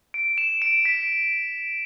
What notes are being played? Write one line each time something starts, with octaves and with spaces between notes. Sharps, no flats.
D7
E7
D7
B6